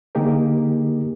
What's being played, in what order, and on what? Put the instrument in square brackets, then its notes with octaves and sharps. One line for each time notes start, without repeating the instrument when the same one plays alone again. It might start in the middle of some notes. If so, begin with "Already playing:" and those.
[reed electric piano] D3 A#3 D#4 G4 G#4 A#4